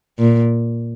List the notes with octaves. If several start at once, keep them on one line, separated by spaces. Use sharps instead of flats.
A#2